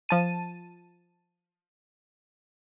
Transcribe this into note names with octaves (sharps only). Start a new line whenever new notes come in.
F3 A5 D#7